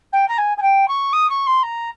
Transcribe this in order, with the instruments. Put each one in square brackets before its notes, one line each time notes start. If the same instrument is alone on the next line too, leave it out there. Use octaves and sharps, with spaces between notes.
[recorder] G5
A#5
G#5
G#5
G5
C#6
D#6
C#6
C6
A#5